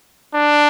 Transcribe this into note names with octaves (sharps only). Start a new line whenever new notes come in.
D4